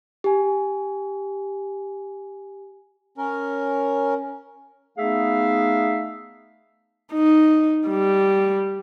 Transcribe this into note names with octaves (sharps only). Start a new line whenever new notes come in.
G4 G#5
C#4 A#4
A3 B3 D#4 G#4 E5 F5
D#4
G3